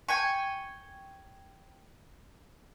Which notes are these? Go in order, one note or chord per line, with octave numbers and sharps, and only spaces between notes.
G5 G#5 C#6